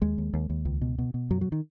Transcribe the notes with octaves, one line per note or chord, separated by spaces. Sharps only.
D#2 G#3
D#2
D#2
D#2
C#2
B2
B2
B2
F#2 F#3
F#3
D#3